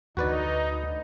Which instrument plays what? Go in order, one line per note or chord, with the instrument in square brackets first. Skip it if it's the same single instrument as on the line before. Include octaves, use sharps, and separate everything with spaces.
[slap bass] D2 [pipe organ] D#4 [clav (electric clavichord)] F#4 B4 D5